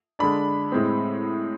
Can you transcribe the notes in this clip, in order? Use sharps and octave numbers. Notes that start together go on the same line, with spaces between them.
D3 G#3 D4 B5
A2 G#3 C4